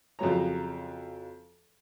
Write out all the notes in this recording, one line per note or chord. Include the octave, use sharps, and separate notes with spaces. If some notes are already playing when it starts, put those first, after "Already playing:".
F2 C#3 F3 F#3 C#5 A#5